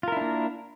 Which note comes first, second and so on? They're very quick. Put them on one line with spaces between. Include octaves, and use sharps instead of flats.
F4 A#4 E4 D4 A#3